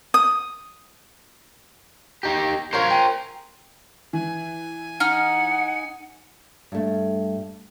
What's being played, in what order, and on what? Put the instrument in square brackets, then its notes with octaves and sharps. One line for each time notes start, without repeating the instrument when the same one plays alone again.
[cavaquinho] D#6
[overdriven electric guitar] D#4 G4
[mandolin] F4 C#5 G6 [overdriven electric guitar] A#4 C5
[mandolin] G5 G#5
[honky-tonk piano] E3 [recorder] G#5
[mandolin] D#4 F6 [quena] F#5
[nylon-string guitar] G2 A3